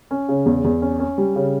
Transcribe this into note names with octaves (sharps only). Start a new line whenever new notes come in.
C#4
C#3
E2
E2
C#4
C#4
G3
C#3